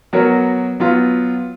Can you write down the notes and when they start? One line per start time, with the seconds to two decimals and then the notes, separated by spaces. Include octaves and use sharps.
0.13 F#3 B3 F#4 A#4 C#5
0.80 F#3 B3 F4